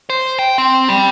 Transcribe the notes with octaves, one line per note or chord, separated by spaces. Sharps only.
C5
G5
C4
G3